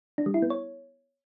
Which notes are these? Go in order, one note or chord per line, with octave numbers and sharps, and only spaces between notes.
D4
G3
E4
B3
C#5